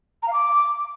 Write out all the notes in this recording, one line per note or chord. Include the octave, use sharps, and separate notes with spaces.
A#5
F5
D6